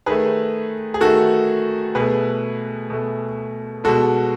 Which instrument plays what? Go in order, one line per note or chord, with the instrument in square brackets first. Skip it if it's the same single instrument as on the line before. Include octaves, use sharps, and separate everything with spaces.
[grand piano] D#3 A3 G#4 B4
G#4
D#3 A3 F#4 A4
B2 A3 G#4 B4
B2 A3
B2 G#3 F#4 A4